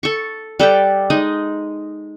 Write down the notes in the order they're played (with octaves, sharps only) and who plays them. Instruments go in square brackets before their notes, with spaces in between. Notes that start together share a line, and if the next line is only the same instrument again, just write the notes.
[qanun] A4 C#6
G3 A4 B4 G5
G#3 D#4 D#5